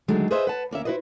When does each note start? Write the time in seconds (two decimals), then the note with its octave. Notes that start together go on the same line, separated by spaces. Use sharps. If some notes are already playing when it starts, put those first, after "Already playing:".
0.08 D3 D#3 F#3 G#3 A3
0.31 G#4 B4 C5 D#5 E5
0.47 B4 F#5 A5
0.71 D2 A#3 C#4 E5
0.85 E4 F#4 B4 C5 D#5